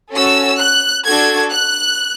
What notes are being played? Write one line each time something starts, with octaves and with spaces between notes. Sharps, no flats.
C#4 F#4 A4 E6
F#6
D4 F#4 A4 G#6
F#6